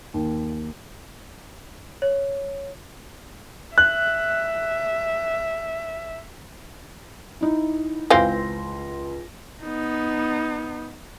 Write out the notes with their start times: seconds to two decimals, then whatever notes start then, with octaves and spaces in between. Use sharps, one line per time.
0.14 D#2
2.02 C#5
3.78 E5 F#6
7.41 D#4 E4
8.10 C#2 E3 C4 F5 C6 A#6
9.63 B3 D#4